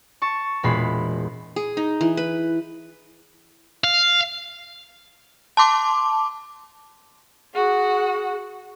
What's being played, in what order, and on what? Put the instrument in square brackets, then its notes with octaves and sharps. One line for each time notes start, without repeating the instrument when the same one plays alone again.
[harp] A5 C#6
E1 A#2 G#3 B3 B5 C7
[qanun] G#4
D#4
E3
B4
[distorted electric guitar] F5
[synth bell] A5 C6 D6
[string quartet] F#4 F#5 [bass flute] G#4